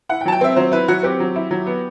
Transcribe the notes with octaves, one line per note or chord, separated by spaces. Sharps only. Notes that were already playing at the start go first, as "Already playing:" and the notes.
E4 F#5
G5
F#3 A5
G5
C4 E5
F#3 C5
E4 B4
F#3 F#4
C4 G4
F#3
E4
F#3
B3